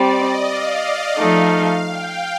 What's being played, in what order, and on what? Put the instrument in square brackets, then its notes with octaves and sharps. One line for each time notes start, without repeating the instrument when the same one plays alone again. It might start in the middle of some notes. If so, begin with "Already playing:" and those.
Already playing: [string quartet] G3 C4 [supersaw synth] D5
[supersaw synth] D#5
F5
[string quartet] F3 A3 D#4
[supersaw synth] G5